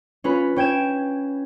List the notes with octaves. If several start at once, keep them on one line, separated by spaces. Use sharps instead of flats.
C#4 F4 B4
C#4 G5 G#6 E7